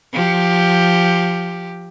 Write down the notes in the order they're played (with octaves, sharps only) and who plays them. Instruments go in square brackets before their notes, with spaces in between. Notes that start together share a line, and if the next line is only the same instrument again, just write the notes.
[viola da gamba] F3 G4